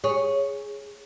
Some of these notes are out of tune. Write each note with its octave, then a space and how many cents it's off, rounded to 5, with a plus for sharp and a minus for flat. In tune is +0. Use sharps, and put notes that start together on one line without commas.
G#4 +0 C#5 +0